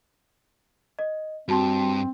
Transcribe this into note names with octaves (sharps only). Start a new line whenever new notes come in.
D#5
G2 C4 F#4 A5 C6